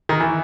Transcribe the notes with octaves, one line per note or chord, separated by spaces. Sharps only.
D#3
E3